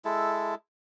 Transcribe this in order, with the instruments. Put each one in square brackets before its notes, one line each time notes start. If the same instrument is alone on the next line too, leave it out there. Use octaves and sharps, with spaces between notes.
[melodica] G#3 E4 A4